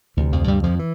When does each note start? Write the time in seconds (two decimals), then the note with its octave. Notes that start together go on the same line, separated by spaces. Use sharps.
0.17 D2 C3 E3
0.32 F2 F3
0.48 G2 G3
0.63 F2 F3
0.79 E3